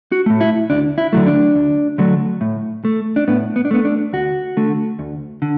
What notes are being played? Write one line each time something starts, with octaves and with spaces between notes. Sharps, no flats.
F#4
A2 A3
E4
D2 D4
E4
D3 F#3 A3
D4
D2
D3 F#3 A3
A2
A3
D4
A2 B3
B3
D4
A3 B3
D4
D2 F#4
D3 A3
D2
D3